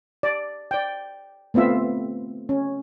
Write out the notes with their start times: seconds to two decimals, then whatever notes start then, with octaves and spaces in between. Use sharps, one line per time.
0.23 D5
0.71 D5 G5
1.54 A3 B3 C4 F4 E5
2.49 C#4